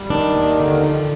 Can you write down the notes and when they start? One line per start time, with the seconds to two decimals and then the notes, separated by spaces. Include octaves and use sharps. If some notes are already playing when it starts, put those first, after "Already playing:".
Already playing: G3
0.10 D#3 D4
0.35 D#2
0.60 D3
0.83 F3